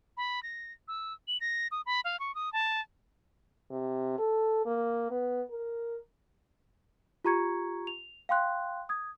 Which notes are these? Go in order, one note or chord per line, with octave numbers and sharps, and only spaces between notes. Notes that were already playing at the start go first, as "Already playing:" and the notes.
B5
A#6
E6
F#7
A#6
D#6
B5
F5
C#6
D#6
A5
C3
A4
A#3
B3
A#4
F4 G4 A#5 C#6 G#6 C#7
F7
F5 G5 C6 F#6
D#6 G#6